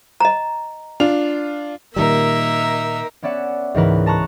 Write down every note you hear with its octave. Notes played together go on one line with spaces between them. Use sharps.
D#5 A#5
D4 F4 F7
A#2 D#3 G3 A#3 D#4 A#4 E5
B3 C#4 D5 E5 F#5
C#2 G#2 E3 A#4 B4
A5 A#5 C#6 F#6